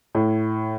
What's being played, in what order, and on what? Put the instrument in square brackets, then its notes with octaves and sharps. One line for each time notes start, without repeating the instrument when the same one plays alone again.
[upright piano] A2